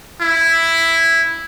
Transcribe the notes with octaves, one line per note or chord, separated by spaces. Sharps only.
E4